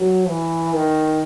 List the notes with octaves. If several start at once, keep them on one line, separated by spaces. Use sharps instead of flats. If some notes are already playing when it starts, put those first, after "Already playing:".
Already playing: F#3
E3
D#3